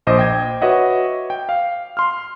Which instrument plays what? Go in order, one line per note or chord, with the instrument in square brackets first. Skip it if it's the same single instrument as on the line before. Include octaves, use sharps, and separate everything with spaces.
[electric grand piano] A#1 C5 D#5 D6
G5 G#6
F#4 B4 C#5 D#5 E5 F#5
G5
F5
C6 F6